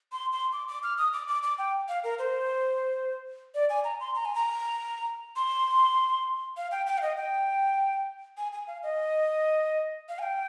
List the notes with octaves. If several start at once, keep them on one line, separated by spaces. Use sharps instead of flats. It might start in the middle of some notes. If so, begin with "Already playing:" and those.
C6
C6
D6
D6
F6
D#6
D6
D6
D6
G5
F5
A#4
C5
D5
G#5
A#5
C6
A#5
G#5
A#5
C6
F5
G5
G5
F5
D#5
G5
G#5
G#5
F5
D#5
F5
G#5
G5